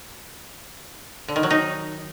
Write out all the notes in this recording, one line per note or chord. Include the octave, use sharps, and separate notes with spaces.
D3
D#3
F#3
D#4